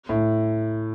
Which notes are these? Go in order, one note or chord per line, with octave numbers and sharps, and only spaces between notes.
A2